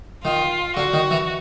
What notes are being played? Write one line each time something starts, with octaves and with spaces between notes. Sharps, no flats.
D#3 F4
D3 F#4
D#3
E3